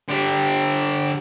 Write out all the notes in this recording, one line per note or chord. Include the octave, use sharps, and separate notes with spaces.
D3 G4